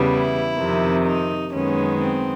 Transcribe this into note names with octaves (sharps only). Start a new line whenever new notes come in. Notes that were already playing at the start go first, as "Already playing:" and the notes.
Already playing: E2 C#3 E3 G3 B3
E4
F2 C3 D#3
D#4
F#2 D#3 G#3 B3 C#4
C4